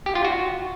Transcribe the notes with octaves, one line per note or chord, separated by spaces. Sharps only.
G4
F4
F#4